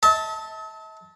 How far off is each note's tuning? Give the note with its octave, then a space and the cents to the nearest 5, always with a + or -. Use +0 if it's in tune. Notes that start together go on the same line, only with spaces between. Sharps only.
E5 -45 A5 +5